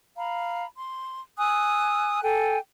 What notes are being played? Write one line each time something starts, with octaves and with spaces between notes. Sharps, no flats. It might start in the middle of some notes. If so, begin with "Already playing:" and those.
F5 A#5 B5
C6
G#5 D#6 E6 F#6
A4 G5 G#5